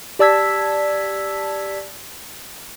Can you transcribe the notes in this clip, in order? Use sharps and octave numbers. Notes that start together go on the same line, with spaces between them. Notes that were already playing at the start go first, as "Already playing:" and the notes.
G4 D5 A5 E6 G#6 B6